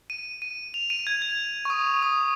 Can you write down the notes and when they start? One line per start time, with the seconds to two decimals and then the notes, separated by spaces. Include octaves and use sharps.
0.10 D#7
0.42 D#7
0.74 F7
0.90 D#7
1.07 G#6
1.22 G#6
1.65 C#6
1.70 D#6
2.03 D#6